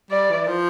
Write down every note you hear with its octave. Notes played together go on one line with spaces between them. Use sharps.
G3 D5
E3
F3